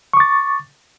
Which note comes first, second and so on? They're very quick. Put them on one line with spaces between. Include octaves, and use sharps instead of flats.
C#6 D6 A6